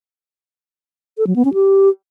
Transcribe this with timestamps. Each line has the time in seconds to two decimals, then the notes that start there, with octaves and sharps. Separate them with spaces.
1.18 A4
1.27 F#3
1.36 B3
1.45 C#4
1.54 G4